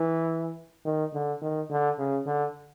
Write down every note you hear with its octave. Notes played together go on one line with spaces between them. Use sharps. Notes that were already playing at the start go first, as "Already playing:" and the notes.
Already playing: E3
D#3
D3
D#3
D3
C#3
D3